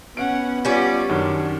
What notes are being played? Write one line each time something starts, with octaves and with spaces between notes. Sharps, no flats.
B3 C#4 F#5 D7
G3 C#4 F4 D5
F#2 D#3 D4